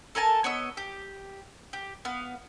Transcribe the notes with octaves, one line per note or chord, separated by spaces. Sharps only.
A4 A#4 G#5 A5
B3 C#5 D#5 E6
G4
G4
B3 F5